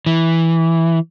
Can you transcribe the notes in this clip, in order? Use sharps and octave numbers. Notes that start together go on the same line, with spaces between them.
E3